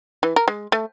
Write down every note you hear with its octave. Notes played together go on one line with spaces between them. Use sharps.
E3
A#4
G#3
A3